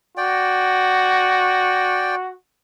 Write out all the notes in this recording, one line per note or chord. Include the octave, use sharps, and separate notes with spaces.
F#4 D5 G5